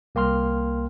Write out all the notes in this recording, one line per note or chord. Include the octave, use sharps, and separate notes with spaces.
C2 A#3 G5 C6 F6